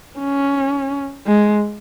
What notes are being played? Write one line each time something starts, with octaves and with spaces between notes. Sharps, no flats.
C#4
G#3